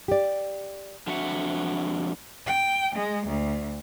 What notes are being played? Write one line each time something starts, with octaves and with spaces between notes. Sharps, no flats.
G4 D5
F2 D4 F#4 E5 F#5
G5
G#3
D2